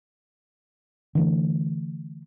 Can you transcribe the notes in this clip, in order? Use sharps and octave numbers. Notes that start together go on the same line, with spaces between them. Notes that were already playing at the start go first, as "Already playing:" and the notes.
D3 E3 A3